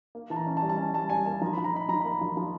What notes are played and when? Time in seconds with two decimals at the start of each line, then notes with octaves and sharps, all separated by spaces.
0.15 A#3
0.30 E3 A5
0.36 A#5
0.46 C#4
0.57 A5
0.62 G3
0.69 A5
0.78 C#4 G#5
0.94 G3 A5
1.10 G3 G#5
1.26 A#3 A5
1.42 F3 A#5
1.53 F3 B5
1.64 A#5
1.74 D#4 B5
1.89 F3 A#5
2.01 A#3 B5
2.12 A#5
2.21 F3
2.37 F3